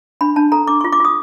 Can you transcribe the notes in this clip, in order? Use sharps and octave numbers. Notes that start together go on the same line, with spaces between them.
D4 B5
D4 A5
A4 A#5
D4 D6
F4 C#6
D6
F4 D#6